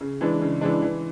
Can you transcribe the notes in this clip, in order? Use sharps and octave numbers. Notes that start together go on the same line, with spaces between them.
C#3
E3 G#3 D4
C#3
E3 G#3 D4
E3